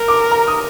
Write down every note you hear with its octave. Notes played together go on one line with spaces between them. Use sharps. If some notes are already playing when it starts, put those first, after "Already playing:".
Already playing: A#4
D6
A#5
D#6